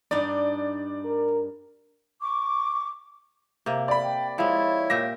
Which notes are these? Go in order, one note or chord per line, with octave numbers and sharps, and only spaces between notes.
G2 D4 D#4 D5
A#4
C#6 D6
C3 A#3
D5 B5
G5
F3 G#3 E4 C#5
A#2 G4 E5 A#6